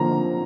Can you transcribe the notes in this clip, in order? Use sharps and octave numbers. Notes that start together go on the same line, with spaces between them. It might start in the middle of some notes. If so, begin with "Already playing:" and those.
Already playing: D3 F3 A#3 A#5